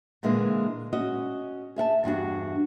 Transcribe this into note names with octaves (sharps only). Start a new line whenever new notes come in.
A#2 D3 E3 G#3 A#3
C#4 F#4 D#5
G#4 E5 F#5 A5
E2 G2 D4 F#4